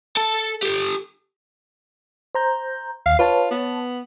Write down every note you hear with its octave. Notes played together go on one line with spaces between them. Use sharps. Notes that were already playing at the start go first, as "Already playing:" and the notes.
A4 A5
G4 A4
C5 A#5 G6
D#2 F5
F4 B4 C#5 A5
B3